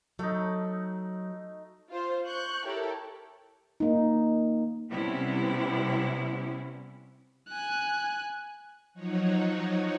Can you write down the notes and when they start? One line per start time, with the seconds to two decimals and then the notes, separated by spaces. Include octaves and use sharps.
0.19 F#3 A3 D#4
1.90 F4 C5
2.27 C#6 F#6 G6
2.64 E4 G4 A4 A#4 C#5
3.80 A#3 D#4
4.89 C3 G3 B3 C#4 E4
7.49 G#5 F#6
8.94 F3 F#3 D#4 F#4 C#5